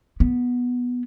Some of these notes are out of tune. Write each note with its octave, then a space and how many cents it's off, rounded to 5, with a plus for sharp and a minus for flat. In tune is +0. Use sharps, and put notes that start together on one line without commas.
B3 -5